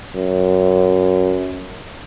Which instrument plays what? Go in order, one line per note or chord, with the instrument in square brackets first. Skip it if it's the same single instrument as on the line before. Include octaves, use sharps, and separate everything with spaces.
[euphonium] F#2